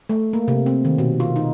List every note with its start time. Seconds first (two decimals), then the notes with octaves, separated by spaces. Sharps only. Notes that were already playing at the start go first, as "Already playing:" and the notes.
0.09 A3
0.33 A#3
0.48 C3
0.66 C4
0.85 D#3
0.98 B2
1.20 F4
1.36 D#4